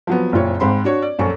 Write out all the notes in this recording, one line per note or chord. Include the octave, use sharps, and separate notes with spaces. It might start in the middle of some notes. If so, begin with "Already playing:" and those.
F3 F#3 B3
F#1 A#2 C4 F4 C#5
G#1 G#2 C4 B5 C6
D4 F#4 C#5
D5
A#1 F#2 A4 C#6